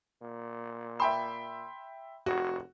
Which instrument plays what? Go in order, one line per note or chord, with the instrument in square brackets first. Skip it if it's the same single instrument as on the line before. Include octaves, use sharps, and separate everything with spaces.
[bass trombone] A#2
[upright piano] E5 G5 C6 [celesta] B5
[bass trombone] F1 [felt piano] F#4